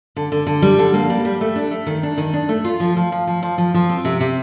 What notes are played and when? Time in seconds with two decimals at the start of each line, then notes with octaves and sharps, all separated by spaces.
0.16 D3
0.32 D3
0.46 D3
0.62 G3
0.79 D3
0.94 A#3
1.10 G3
1.25 G3
1.41 A3
1.56 D4
1.71 A3
1.86 D#3
2.03 D4
2.18 D#3
2.34 D4
2.49 A3
2.64 F4
2.80 F3
2.97 F3
3.12 F3
3.27 F3
3.43 F3
3.58 F3
3.74 F3
3.89 C4
4.05 C3
4.20 C3